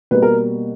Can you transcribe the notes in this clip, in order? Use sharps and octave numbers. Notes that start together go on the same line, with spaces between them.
B2 G3 A#3 B4
A#4